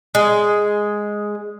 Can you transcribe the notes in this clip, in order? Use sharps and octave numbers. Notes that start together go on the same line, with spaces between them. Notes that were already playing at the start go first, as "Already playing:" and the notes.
G#3